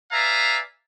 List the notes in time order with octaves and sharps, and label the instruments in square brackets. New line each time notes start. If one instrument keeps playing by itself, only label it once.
[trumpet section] B4 D5 E5 F5 G#5 A#5